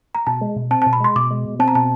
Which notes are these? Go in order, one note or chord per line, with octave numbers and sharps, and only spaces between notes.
A#5
B2 A5
G#3
B2
C4 A5
A5
B2
B5
G#3 C6
B2 D6
G#3
B2
C4 A5
A#5
B2 A5